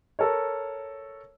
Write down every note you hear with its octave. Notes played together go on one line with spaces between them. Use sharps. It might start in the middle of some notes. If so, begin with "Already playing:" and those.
A4 A#4 C#5